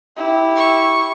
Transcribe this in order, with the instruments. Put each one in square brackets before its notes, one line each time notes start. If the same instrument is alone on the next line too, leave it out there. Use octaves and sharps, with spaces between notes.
[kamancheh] E4 G4
[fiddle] C#6